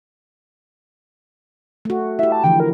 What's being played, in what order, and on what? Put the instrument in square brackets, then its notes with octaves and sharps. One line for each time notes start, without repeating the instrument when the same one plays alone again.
[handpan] A3 F#4
[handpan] E4 G4 [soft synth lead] E5
[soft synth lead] A5
[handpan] D3 E3 F3 [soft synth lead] G5
[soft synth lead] A#4